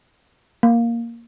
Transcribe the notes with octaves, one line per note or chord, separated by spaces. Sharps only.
A#3